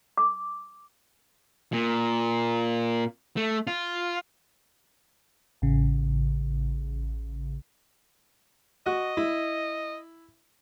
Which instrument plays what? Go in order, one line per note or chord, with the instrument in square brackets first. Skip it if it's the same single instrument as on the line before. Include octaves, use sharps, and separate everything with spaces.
[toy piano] D6
[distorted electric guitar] A#2
A3
F4
[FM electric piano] A1 C#3
[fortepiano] F#4 [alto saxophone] D#5
[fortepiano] E4